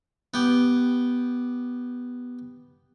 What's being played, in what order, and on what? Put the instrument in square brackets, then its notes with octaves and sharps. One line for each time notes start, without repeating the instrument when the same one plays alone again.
[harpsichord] B3 G4